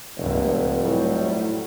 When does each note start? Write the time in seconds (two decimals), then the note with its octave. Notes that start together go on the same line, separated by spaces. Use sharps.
0.17 F1 C#2 G2 A#2
0.82 A2 F#3 G3